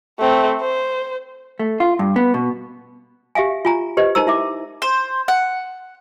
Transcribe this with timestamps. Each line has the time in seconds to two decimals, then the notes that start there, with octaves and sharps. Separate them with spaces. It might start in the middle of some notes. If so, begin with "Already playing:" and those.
0.19 A3 C4
0.61 C5
1.59 A3
1.80 F4
1.99 G2
2.16 B3
2.34 B2
3.35 G4 E5 F5 G#5
3.65 F4 G#5 A#5
3.97 G4 B4 C5 D#5
4.15 D#4 A#4 C5 A#5 E6
4.27 E4 E5 D6
4.82 C5
5.28 F#5